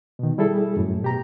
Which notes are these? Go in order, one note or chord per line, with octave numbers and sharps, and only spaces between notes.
B2 D#3
G3 E4 G#4 A4
F#2 A2
B2 G4 A#5